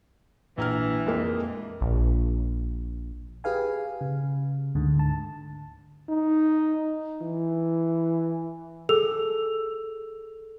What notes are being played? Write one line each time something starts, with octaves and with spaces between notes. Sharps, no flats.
A#1 E3 A#5 F6
F2 G#3 A#3
A#1
G4 G#4 B4 F5 G#5
C#3
D2 G#2 D3
A5
D#4
E3
G#4 A4 E6 F7